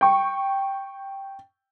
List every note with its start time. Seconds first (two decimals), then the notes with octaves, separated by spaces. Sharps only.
0.01 G5 C#6